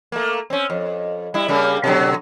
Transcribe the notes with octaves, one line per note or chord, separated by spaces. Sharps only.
A3 A#3
C4 C#4
F2
G3 E4
C#3 G3 A#3
B2 D3 F#3